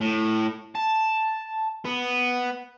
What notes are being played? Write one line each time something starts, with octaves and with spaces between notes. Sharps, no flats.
A2
A5
B3